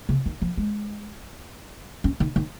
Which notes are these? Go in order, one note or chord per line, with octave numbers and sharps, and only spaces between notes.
C#3
D#3
F3
G#3
C#4
D#3
D#3